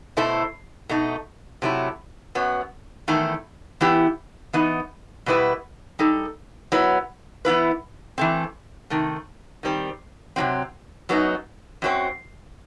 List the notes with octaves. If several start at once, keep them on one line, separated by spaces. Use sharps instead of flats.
B2 A3 E4 A4 C5
B2 A3 D#4
C3 F#3 A3 E4
F#2 F#3 B3
E2 D#3 A3 E4 A4
E3 B3 E4 G4
E3 B3 D#4
B2 G3 B3 E4 B4
G3 D#4 A4
F#3 B3 E4 B4
E3 B3 E4 B4
E3 A3 C4
C3 D#3 A3
D#3 G3 C4
C3 D#3 F#3 C4
F#2 F#3 B3 D#4
F#2 F#3 C4